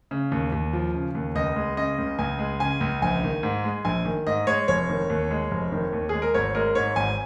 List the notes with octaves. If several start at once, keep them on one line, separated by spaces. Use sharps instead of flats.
C#3
D#2
D#2
F3
C#3
D#2
C#2 D#5
G#3
C#3 D#5
C#2
C#2 G#5
G#3
C#3 G#5
C#2
A#1 G#5
D#3
G#2
G#3
A#1 G#5
D#3
G#2 D#5
G#3 C#5
F1 C#5
D#3
D#2
G#3
F1
D#3
D#2
G#3 G#4
A#4
G#1 C#5
G#3 A#4
G#2 C#5
G#1 G#5